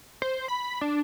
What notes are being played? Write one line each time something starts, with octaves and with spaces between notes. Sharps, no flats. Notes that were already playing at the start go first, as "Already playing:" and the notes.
C5
B5
D4